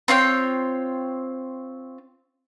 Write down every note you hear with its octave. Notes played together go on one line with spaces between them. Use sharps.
C4 F4 C#5 G5